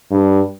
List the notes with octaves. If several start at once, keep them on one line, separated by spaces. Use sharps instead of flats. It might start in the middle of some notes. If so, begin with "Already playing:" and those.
G2